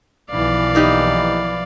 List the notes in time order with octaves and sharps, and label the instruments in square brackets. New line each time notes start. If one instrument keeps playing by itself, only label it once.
[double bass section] B1 E3 F3 [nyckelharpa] D5 F5
[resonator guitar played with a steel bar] A#3 D#4 G4